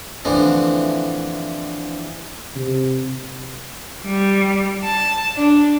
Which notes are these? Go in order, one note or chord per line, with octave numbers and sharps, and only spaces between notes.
A2 D3 E3 F3 C4
C3
G3
A5
D4